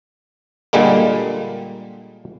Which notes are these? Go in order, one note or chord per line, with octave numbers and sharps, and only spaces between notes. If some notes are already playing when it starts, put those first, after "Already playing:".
A#2 D3 G3 G#3 A#3